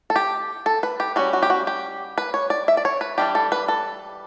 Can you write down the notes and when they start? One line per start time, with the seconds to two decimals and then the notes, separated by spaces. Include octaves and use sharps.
0.10 A4
0.16 G4
0.66 A4
0.83 B4
1.00 G4
1.16 G3 C#4 F#4
1.33 F#4
1.43 G4
1.50 F#4
1.67 G4
2.18 B4
2.34 C#5
2.50 D5
2.68 E5
2.77 D5
2.85 C#5
3.01 B4
3.18 E3 G3 D4 G4
3.35 A4
3.52 B4
3.68 A4